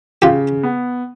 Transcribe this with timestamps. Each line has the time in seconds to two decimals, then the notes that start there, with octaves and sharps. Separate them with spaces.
0.22 C#3 F4 G4
0.63 B3